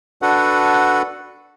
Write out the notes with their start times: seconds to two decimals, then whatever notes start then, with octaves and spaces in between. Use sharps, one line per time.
0.22 D4 F#4 A4 B4 F#5